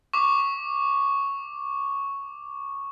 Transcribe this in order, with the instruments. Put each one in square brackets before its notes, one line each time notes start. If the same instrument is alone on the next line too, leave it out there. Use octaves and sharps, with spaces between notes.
[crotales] C#6 D6